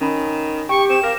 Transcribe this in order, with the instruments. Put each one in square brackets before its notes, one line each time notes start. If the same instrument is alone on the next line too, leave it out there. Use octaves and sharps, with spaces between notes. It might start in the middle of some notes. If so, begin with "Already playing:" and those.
[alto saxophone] D#3 [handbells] C#4 B5
[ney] G4 [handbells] G5 [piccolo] C#6
[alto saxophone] C4 [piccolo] E7
[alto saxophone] A#4 [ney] F5 [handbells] D6 A#6